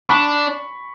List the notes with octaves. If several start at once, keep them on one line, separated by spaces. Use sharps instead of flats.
D4 B5 C#6